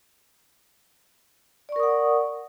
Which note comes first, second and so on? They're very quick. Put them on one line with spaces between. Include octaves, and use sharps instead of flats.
D5 C#6 A#4 D#6 F#5